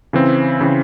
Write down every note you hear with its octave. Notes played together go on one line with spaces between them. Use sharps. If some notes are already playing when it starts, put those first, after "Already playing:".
C#3 E3 C4
C#3 E3 C4